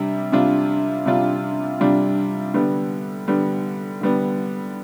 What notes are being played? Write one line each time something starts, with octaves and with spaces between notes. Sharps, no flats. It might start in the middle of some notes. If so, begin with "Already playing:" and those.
Already playing: C3 G3 D4
C3 G3 D4 F4
C3 G3 D4 F4
C3 G3 D4 F4
D3 G3 B3
D3 G3 B3
D3 G3 B3